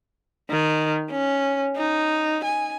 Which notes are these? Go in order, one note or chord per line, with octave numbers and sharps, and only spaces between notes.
D#3
C#4
D#4
G#5